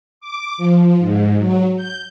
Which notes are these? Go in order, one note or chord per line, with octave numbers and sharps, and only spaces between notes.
D6
F3
G#2
F#3
G6